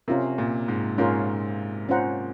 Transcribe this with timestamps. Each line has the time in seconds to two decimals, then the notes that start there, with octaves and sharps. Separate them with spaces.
0.08 C3 C#4 F4 A#4
0.38 A#2
0.68 G#2
0.98 G#2 C#4 F4 A#4
1.89 C#4 F4 C5 F#5 A#5